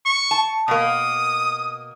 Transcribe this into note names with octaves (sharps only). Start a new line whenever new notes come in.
C#6
A5
B2 A#3 D#6